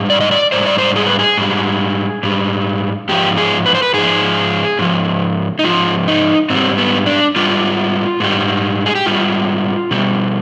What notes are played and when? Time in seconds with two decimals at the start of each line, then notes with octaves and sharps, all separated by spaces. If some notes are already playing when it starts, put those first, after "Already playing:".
Already playing: G#2 G3
0.10 D5
0.20 D#5
0.31 D5
0.52 G#2 G3 C5
0.66 D5
0.78 C5
0.96 G#4
1.07 B4
1.19 G#4
1.38 G#2 G3
2.23 G#2 G3
3.09 G#2 F3 G4
3.37 G#4
3.66 B4
3.75 C5
3.83 B4
3.94 G#2 F3 G#4
4.79 G#2 F3
5.59 D#4
5.64 G#2 F3 F4
6.08 D#4
6.50 G#2 G3 C4
6.78 B3
7.06 D4
7.36 G#2 G3 F4
8.20 G#2 G3
8.86 G#4
8.95 G4
9.06 G#2 G3 F4
9.91 B2 G3